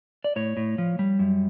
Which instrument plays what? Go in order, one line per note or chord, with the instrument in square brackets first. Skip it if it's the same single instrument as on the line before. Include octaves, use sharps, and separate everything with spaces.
[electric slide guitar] D5
A2 C#5
A2
F3
G3
F#2